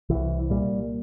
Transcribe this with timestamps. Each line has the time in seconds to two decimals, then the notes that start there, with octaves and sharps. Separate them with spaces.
0.10 C2 E3
0.50 A#2 G3